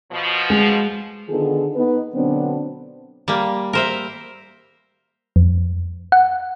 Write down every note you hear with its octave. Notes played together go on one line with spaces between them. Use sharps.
B2 F3
G#3
D3 D#3 B3 F4 G#4 A4
B3 D#4 B4
B2 D3 F#3 B3 C4 D4
G3 A#3
A#4 C5 E5
F2
F#5